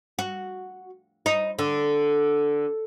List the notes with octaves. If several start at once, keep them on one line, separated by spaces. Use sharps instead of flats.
F#4
D#4
D3